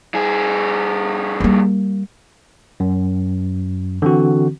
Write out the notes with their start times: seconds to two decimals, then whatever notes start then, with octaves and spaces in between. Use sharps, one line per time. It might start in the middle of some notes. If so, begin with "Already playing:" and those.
0.14 G2 G#4
1.40 G3 A#3
2.80 F#2
4.02 D3 E3 C4 F#4